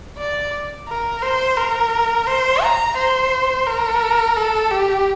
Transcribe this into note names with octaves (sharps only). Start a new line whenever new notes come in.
D5
A#4
C5
A#4
C5
A#5
C5
A#4
A4
G4